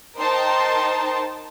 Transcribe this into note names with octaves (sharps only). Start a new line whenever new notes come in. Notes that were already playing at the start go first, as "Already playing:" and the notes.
D#4 A#4 C5 G5 A5 C6